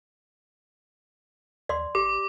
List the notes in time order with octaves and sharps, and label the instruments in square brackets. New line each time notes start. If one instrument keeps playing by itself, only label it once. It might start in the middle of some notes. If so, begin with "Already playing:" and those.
[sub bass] D#2 [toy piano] D5 C6
[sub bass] G1 [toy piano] G4 [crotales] D6